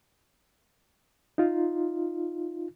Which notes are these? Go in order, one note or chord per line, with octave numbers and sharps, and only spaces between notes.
D#4 F4